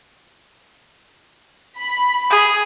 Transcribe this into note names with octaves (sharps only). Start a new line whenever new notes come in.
B5
G#4